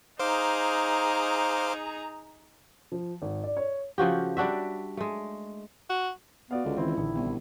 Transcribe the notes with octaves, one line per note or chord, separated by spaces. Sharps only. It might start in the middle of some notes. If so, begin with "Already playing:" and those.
D#4 G#4 C5 F5 A#5 D6
F3
G#1
D5
C#5
C#3 F3 F#4 G4
G3 D4 F#4 E5
G#3 A3
F#4
B3 F#4 D5 F5
C#2 D3
D#3 E3 C4 E4
A#1 D3 D#4
C2 B3